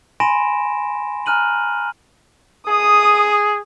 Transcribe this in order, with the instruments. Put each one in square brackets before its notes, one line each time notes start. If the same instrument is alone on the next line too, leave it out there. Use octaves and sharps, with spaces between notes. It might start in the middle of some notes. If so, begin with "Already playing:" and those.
[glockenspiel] G#5 B5 C6 A#6 D7 E7
G#5 A#5 F6 F#6 D#7 F#7
[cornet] G#4 [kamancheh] D#6